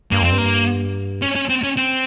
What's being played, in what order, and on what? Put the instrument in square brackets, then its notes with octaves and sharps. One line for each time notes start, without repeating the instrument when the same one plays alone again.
[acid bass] G2 [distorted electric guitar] A#3
[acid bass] F2 [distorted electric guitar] C4
[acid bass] G2
[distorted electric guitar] A#3
C#4
C#4
C4
C#4
C4